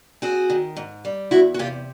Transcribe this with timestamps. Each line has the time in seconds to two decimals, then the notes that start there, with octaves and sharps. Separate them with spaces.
0.22 C4 F#4 G#4
0.50 D#3
0.76 G#2
1.05 G3
1.31 E2 E4 F#4
1.54 F#4
1.59 C3 F4 G4